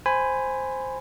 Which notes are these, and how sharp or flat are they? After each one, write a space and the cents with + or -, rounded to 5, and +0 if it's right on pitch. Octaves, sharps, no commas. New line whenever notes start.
C5 +0 G#5 -5 B5 +15